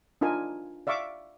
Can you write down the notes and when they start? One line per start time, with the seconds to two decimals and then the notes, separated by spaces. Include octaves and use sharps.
0.21 D4 D#4 F4 A#4 G#5
0.87 D5 E5 F5 C#6 D6